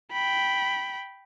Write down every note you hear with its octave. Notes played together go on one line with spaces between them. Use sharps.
G5 B5